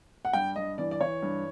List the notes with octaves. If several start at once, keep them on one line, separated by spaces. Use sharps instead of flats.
F#5
G2 G5
G2 D#5
E3 D5
D5
E3 C#5
G2